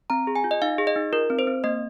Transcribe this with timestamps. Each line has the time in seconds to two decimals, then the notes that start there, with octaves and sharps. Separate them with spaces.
0.10 C4 A#5
0.27 G#4
0.35 G#5
0.44 F4
0.51 D#5
0.62 D#4 F5
0.78 G#4
0.87 D#5
0.96 D#4
1.13 F4 A#4
1.30 C4
1.39 C5
1.47 C4
1.64 A#3 D#5